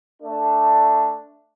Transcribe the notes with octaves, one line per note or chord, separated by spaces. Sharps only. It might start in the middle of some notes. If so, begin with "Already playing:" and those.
A3 D4